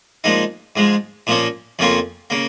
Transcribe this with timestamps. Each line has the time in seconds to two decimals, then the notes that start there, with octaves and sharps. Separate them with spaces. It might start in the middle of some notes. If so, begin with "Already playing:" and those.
0.24 A#2 F3 G#3 D#4
0.76 G#2 F3 G#3
1.27 A#2 F3 A#3 C#4
1.79 F2 C#3 A#3 C#4 F4
2.30 C#3 A#3